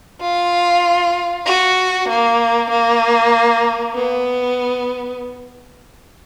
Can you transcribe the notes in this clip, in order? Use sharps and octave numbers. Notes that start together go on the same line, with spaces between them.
F4
F#4
A#3
A#3
B3